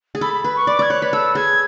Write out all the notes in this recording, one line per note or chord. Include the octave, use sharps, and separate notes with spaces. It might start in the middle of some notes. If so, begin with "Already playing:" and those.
G#4
A4 B5
B5
B4 B5
C#6
D5 D6
D5 G#6
C#5 F#6
B4
A4 E6
G#4 G#6